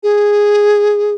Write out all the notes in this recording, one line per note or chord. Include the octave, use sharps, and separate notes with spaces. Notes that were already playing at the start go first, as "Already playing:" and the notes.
G#4